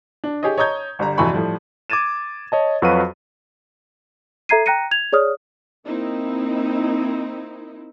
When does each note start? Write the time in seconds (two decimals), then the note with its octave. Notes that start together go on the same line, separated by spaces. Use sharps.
0.24 D4
0.43 G4 G#4 C#5 D#5
0.58 C#5 D#5 A#5 D#6 G6 G#6
0.99 G1 G3 A#5
1.17 F1 F2 E3 F#4 B5 C#6
1.32 A2 F3 G3
1.90 D6 G#6 A6 D#7 E7
2.52 C#5 D#5 A5
2.82 F2 F#3 F#4 B4 F5 D#7
4.49 A4 E5 A#5 G#6 C7 D#7
4.66 G5 A#5 F#6 A#6 C#7 D#7
4.91 G#6 F7
5.13 G#4 C#5 D5 D#6 F6
5.85 A#3 C4 D#4 E4